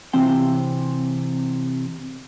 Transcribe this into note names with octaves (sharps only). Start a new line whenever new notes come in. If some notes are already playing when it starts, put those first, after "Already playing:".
C3 E3 C4 G5